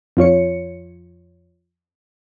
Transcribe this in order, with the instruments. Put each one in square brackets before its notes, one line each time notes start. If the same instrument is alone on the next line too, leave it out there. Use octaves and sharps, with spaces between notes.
[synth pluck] F2 F4 C#5 C#7